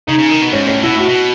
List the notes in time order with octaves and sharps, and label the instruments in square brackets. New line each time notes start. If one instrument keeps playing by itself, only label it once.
[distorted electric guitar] C#3 [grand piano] D#4
[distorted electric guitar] C#3
D#3
B2
[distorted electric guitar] G#2 [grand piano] C#4
[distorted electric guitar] A2 [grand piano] C#4
[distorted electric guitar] B2 [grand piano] E4
[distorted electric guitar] A2 [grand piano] F#4
[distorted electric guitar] B2